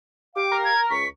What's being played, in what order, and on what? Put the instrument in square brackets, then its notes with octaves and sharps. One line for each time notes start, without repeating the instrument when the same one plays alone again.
[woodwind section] G4 F5 [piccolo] D6
[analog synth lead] A#4
[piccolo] G#6
[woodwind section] C#2 C#6 [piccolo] B6